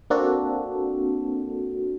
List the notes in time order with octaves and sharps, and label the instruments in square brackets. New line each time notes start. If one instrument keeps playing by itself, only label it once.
[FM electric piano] A#3 C4 D4 F#4 A4